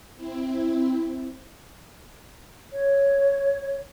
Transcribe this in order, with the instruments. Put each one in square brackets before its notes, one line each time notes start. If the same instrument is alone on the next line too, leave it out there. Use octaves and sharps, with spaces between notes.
[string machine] C4 E4
[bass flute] C#5